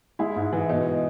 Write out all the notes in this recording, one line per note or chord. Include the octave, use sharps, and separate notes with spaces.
G#3 E4
G#2
E3
B2 D#4